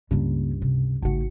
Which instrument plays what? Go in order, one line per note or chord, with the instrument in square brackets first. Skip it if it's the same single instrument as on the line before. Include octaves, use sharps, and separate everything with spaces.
[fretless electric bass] C#2 G2 [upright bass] C#3 A#3
[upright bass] C3
[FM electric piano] G#1 F#4 [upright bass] C#3 A3